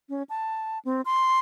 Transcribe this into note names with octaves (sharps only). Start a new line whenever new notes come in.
C#4
A5
C4
C6